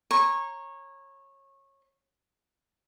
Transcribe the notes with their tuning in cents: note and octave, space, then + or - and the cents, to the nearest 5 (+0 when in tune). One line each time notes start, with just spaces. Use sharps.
C#5 -20 A#5 +0 C#6 -20